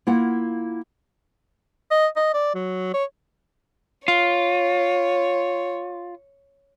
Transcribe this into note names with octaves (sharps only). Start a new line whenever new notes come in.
A#3 E4 F4 F#5
D#5
D#5
D5
F#3
C#5
F4 C#5